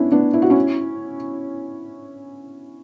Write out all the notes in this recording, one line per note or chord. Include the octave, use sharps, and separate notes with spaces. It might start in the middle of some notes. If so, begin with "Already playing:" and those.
Already playing: B3 C#4 D4 E4
B3 D4
E4
F#4
C#4 E4